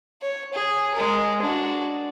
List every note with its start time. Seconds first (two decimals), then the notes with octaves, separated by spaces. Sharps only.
0.22 C#5
0.54 G#4
0.95 G#3 A#4
1.42 D4 F#4